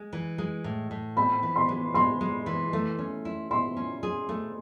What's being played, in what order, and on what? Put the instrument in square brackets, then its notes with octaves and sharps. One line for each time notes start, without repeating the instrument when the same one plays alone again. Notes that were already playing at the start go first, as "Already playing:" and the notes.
Already playing: [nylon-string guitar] G#3
E3
G#3
A2
A2
[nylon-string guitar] C4 [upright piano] B5
[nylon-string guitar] E3
[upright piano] C6
[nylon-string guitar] G#3
[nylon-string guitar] G#3 [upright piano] C6
[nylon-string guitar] G#3
E3
A3
C#4
E4
[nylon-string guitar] E4 [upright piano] C6
[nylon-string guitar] C#4
G#4
A3